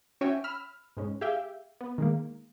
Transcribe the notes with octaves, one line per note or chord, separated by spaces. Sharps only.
C#4 F#4 C#5 E5 G5 G#5
B5 E6 F6
G#2 G#3 C#4
G4 G#4 E5 F5 G5
B3
D#3 G#3 A#3